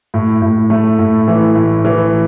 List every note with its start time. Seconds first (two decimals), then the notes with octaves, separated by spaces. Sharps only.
0.14 A2
0.42 A2
0.70 A3
0.99 A2
1.28 E3
1.55 A2
1.85 E3